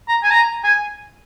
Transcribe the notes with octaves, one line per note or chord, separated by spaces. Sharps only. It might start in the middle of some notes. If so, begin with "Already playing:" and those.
A#5
G#5
A#5
G#5